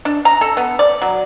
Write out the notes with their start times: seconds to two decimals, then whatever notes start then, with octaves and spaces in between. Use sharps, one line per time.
0.05 D4
0.25 A#5
0.41 A4
0.57 B3
0.79 D5
1.02 F#3